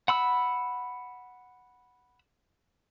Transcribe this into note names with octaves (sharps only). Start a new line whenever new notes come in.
F#5 B5 E6